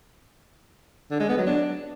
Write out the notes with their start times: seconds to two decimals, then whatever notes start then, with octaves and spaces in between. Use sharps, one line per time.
1.11 D3
1.20 G#3
1.29 B3
1.38 F#3
1.47 D4